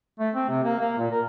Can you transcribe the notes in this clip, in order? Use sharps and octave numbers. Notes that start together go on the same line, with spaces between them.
A3
C4
C3
A#3
A#3
A#2
A#4